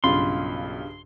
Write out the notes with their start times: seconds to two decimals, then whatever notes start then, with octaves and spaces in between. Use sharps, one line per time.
0.04 B1 G2 C#3 F4 B5 C6